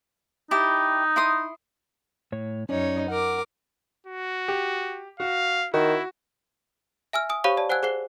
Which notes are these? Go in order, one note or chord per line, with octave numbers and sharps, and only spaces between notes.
D#4 E4 G4 A5
E4 C6 D#6
A2 C#5
F#2 C#4 D#4 C#5 D5
A#4 F#5 D6
F#4
G4
F#4 F5
D#3 E4 F#4
E5 G#5 E6 F6
G#5 D#6
G4 C5 C#5 F5 B5 C#6
C#5 D5 A5
C5 F#5 G#5 E6 F#6 G#6
G#4 C5 F#5 C7 G7